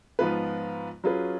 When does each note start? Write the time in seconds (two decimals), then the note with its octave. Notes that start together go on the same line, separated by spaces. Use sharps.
0.19 G#2 F3 B3 F4 B4
1.04 F#3 C#4 F4 G#4 B4